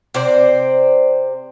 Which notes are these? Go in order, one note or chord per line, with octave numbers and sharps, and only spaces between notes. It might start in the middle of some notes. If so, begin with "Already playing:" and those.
C3 C5 D5